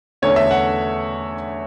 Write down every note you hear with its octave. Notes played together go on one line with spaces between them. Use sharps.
E2 D3 A3 C#4 C#5
E5
F#5